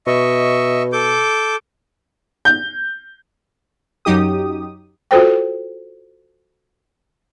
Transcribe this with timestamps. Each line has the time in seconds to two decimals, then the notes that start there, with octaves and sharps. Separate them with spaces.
0.07 B2 D#5 E5 C#6
0.93 A4 D6 G6
2.45 G6
4.05 F#2 F#3 D#4 G4 D#6
5.11 F4 F#4 A4 C5 G5